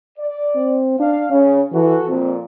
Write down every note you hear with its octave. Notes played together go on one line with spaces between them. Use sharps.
D5
C4
D4 F5
C#3 C#4
E3 F#4 A4
F2 A#2 C4